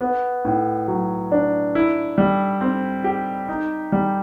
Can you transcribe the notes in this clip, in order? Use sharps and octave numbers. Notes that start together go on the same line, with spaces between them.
B3
A2
F#3
D4
E4
G3
C4
G4
D#4
G3